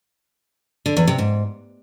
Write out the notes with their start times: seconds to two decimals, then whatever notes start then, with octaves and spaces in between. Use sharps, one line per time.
0.86 D3
0.97 E2
1.08 C3
1.18 G#2